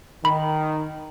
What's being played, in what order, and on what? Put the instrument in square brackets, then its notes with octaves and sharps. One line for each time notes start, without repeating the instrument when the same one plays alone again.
[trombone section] D#3 [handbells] B5